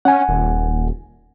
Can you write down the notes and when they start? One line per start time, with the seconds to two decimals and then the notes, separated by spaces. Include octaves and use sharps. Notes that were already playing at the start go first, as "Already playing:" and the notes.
0.05 C#4 F#5 G#5
0.29 D#1